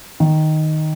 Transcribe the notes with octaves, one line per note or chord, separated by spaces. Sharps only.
D#3